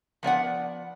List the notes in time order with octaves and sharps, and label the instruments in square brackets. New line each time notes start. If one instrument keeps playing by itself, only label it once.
[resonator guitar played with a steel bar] F3 B3 D5 F#5